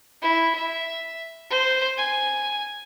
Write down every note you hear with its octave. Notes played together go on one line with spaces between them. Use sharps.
E4
E5
C5
G#5